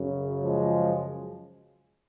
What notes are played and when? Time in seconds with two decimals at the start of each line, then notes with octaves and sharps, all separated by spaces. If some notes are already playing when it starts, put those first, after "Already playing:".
Already playing: F#2 C#3
0.44 F3 G#3